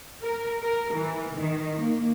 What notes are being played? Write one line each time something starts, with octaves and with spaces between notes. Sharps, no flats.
A#4
A#4
E3
D#3
A#3